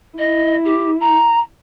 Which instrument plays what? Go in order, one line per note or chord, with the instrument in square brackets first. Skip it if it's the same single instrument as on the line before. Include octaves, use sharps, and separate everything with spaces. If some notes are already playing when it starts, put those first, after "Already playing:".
[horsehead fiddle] E4 [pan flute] D#5
[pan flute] G4
A#5